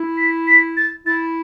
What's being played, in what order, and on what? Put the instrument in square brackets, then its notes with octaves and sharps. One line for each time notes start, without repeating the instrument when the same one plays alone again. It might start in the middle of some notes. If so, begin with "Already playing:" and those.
Already playing: [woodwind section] E4
[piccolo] B6
B6
A6
[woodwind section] E4 [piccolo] A6